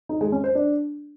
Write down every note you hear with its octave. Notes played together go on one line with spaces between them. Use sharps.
D#4
G#3
C#4
C5
D4